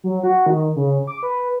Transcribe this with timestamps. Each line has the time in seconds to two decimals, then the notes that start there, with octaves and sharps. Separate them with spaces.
0.04 F#3
0.24 F#4
0.46 D#3
0.76 C#3
1.07 D6
1.23 B4